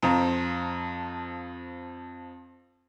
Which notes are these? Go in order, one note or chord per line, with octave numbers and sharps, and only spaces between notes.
F2 F3 C4 A#5